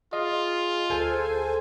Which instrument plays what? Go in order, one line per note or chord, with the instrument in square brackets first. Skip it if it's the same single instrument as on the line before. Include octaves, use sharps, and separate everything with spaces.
[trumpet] F4 [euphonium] G#4 [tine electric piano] D#5
[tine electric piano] D2 [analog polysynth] A4 C5 G#5